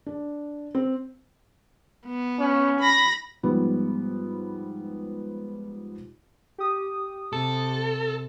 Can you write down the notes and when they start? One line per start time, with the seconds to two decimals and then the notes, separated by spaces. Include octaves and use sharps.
0.06 D4
0.75 C4
2.06 B3
2.39 C#4
2.80 B5 A#6
3.43 G#2 F3 G3 B3
6.58 G4 D#6
7.33 C3 A4